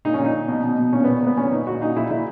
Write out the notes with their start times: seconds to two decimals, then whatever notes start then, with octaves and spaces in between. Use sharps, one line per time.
0.05 A#2 D#4
0.14 C#4
0.19 A#2
0.25 D#4
0.34 A#2
0.49 B2
0.64 B2
0.78 B2
0.92 A#2 C#4
1.04 A#2 B3
1.22 A#2 B3
1.37 A#2 C#4
1.52 A#2 D#4
1.66 A#2 F#4
1.82 A#2 D#4
1.96 A#2 E4
2.10 A#2 E4